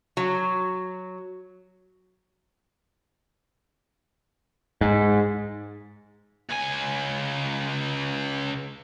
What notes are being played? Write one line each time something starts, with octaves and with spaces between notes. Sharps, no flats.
F#3
G#2
C#2 G#5